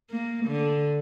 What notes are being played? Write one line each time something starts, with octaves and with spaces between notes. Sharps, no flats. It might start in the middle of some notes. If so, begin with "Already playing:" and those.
A#3
D3